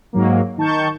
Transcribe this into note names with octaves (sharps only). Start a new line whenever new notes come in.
G#2 F#3 A#3
D#3 A5 C#6 G6